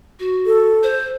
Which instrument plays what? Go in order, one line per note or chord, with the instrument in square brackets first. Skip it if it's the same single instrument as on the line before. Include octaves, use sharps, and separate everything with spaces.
[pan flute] F#4
[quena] A4
[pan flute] C5